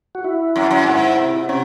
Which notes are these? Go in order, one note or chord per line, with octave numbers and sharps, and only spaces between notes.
F#4
E4
F#2
F#2
G#2
C3
C3 C#4